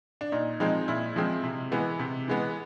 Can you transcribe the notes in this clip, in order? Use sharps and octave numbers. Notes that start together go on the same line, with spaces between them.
D4
A#2 D#4
F3 G#3 C4 D#4
A#2 E4
F3 G#3 C4
C3
E3 G#3 B3
C3
E3 G#3 B3